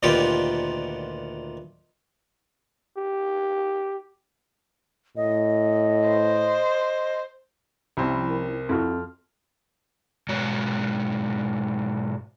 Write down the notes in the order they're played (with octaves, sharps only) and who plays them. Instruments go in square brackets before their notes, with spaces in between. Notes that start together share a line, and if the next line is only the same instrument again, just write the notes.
[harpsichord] D2 A#2 D#3 B3 F4 G4
[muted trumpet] G4
[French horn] A2 [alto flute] D#5
[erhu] C5
[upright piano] C2 C4 [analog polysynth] F3 C#4 E4 [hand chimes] B5
[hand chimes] A#4
[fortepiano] F2 [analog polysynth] E4 F#4 [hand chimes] C6 F6
[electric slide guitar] G#2 B2 G#3 F#4 C#5 A#5